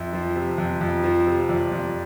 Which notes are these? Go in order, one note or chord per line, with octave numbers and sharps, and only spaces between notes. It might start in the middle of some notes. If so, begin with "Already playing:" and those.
Already playing: F2 E5
F3
C3
F2
F2
F3
C3
F2 D5
F2